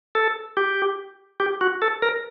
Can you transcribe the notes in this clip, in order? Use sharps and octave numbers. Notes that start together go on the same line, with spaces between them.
A4
G4
G4
F#4
A4
A#4